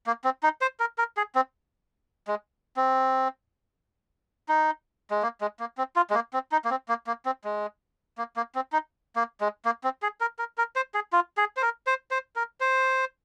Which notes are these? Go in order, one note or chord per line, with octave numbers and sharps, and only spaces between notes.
A#3
C4
D#4
C5
A#4
A#4
G#4
C4
G#3
C4
D#4
G#3
A#3
G#3
A#3
C4
F4
G#3
A#3
C4
D#4
A#3
C4
A#3
A#3
C4
G#3
A#3
A#3
C4
D#4
A#3
G#3
A#3
C4
G#4
A#4
A#4
A#4
C5
G#4
F4
G#4
C5
A#4
C5
C5
A#4
C5